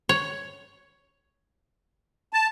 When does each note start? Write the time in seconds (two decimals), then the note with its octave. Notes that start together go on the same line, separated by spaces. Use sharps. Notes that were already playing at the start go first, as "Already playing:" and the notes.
0.09 C#5
2.33 A5